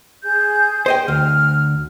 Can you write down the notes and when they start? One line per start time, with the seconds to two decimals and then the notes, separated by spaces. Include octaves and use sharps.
0.23 G#4 G6
0.86 C5 D#5 G5
1.08 D2 F6